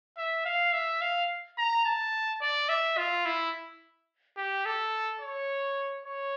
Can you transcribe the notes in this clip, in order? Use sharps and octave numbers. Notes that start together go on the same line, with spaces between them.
E5
F5
E5
F5
A#5
A5
D5
E5
F4
E4
G4
A4
C#5
C#5